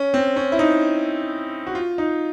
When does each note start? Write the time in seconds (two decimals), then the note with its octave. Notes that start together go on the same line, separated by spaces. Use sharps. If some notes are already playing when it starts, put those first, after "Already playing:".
Already playing: C#4
0.14 C4
0.36 C#4
0.52 E4
0.59 D#4
1.67 F#4
1.75 F4
1.98 D#4